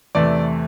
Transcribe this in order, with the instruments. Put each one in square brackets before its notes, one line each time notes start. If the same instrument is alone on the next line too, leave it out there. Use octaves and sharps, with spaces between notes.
[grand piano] E2 C3 E3 A3 D5